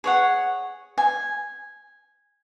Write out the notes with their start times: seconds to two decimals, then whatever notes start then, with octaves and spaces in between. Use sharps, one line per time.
0.04 G#4 C#5 F#5
0.98 G#5